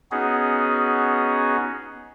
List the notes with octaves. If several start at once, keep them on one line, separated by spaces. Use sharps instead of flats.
B3 C#4 D#4 F#4 G#4